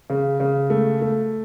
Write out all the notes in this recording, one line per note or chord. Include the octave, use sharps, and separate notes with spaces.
C#3
C#3
A3
A3